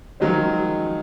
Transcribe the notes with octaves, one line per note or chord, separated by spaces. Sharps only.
D#3 F3 F#3 G#3 C#4 C5